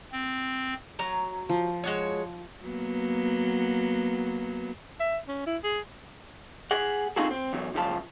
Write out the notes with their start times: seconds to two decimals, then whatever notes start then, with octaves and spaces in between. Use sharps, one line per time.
0.12 C4
0.99 F#3 A#5
1.49 F3
1.84 G#3 F#4 C#5
2.64 F#3 A#3 B3
5.00 E5
5.28 C#4
5.46 E4
5.64 G#4
6.71 G#4 F#5
7.16 C4 D#4 F4 F#4 G#4 A4
7.31 C4
7.53 E2 F#3
7.74 C#2 F#2 C#3 F3 F4 A5